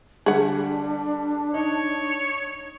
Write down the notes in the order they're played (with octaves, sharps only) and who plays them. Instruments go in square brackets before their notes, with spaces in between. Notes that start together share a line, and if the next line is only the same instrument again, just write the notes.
[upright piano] D3 G3 [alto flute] D4 [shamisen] G#4 F#5
[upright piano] D#4 [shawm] C#5